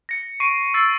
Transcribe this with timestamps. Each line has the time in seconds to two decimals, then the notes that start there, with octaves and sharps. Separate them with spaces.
0.09 A#6 C#7
0.40 C#6 C7 D7 D#7
0.74 E6 A6 C7